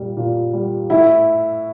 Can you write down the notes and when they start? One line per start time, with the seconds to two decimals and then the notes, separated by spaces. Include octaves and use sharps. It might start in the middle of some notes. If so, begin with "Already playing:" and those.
Already playing: A#2 G3
0.17 A#2
0.53 G3
0.90 A2 E4